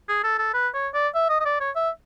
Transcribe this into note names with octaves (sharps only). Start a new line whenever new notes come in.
G#4
A4
A4
B4
C#5
D5
E5
D#5
D#5
D5
C#5
E5